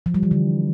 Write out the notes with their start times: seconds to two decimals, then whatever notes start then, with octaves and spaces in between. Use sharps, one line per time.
0.06 F3
0.14 G3
0.23 E3
0.31 D3